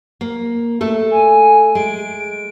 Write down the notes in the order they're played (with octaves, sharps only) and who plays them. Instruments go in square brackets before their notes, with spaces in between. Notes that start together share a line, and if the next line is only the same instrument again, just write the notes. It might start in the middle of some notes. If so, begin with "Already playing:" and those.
[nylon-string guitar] A#3
A3 A4
[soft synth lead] G#5
[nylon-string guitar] G#3 [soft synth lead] D7